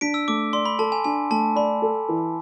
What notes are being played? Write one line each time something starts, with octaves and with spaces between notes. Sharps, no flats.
D4 B6 D7
E6
A3 D6
D5 C6
B5
A4 A5
G#5
D4 G#5
A3 A5
D5 B5
A4
E3